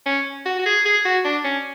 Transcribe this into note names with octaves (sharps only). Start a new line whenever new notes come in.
C#4
F#4
F#4
G#4
G#4
F#4
D4
C#4